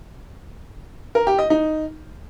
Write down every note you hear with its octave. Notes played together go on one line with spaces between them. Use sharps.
A#4
G4
D#5
D#4